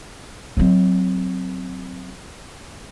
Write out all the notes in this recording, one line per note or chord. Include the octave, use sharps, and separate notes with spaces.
F#3 C4